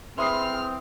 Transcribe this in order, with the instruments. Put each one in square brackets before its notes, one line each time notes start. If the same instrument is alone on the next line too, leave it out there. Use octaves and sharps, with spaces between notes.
[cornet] C4 [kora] E4 B4 [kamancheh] G#4 F6 [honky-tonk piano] C6 D#6 C7